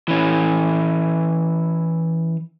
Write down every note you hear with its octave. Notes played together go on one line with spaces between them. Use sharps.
E3 C#4